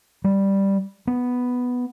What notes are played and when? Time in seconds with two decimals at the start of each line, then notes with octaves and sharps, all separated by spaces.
0.24 G3
1.07 B3